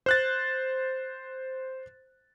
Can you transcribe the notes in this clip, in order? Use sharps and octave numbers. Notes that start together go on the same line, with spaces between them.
C5 F#6 A6